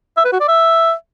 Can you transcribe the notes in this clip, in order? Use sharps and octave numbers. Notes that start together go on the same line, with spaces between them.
E5
B4
F#4
D5
E5